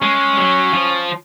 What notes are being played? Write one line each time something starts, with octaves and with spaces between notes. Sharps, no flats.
G#3 C#4
F#3
F3